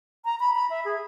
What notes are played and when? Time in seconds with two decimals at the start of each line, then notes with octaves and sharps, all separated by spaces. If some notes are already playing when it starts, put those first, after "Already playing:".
0.25 A#5
0.40 B5
0.55 B5
0.70 E5
0.85 G#4